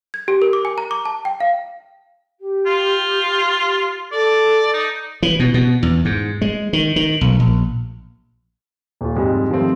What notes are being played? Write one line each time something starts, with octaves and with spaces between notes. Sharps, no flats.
G#6
G4
A#4
D6
G#5
A#5
D6
A5
G5
F5
G4
F4
A4 D5
D#4
E3
B2
B2
E2
G#2
G#3
D#3
D#3
B1
A#1
D#1 F4
F2 G#2 G3
D#3 F3 G3 A3 C4